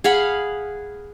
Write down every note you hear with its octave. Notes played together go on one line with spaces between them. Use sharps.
G#4 F5 F#5 B5